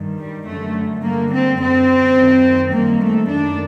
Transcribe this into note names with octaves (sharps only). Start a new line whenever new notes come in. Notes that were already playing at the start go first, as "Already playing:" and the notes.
Already playing: G2 D#3
G3
F#2 D3 A3
G2 D3 A#3
C4
F#2 D3 C4
F#2 D#3
G2 D#3 A#3
A3
F#2 D#3 D4